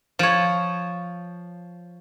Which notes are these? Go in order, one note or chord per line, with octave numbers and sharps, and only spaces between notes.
F3 C#5